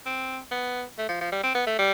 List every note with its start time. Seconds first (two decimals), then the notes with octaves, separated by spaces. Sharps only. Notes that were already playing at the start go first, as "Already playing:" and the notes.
0.06 C4
0.51 B3
0.98 A3
1.09 F3
1.21 F3
1.32 G3
1.44 C4
1.55 B3
1.67 A3
1.79 G3